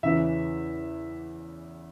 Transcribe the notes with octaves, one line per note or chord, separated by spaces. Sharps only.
E2 C#3 E3 E5